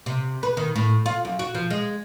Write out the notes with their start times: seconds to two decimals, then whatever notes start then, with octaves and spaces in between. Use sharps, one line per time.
0.06 C3
0.43 B4
0.57 D#3
0.76 A2
1.06 F4
1.25 F#2
1.39 F#4
1.55 F3
1.70 G#3